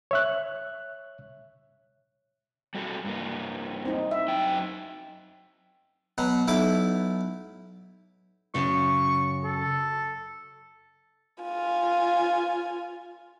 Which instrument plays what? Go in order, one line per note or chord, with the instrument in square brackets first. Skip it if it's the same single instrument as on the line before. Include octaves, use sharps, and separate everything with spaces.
[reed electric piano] C#5 E5 F#6
[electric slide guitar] G3 F#4 A4
G2 A#3
[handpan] C4 D#4
E5
[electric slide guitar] F#2 G5
[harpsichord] B2 F#3
B1 E4 D6
[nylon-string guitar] F#2 C#3 [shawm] C#6
[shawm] A4
[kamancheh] F4 G#5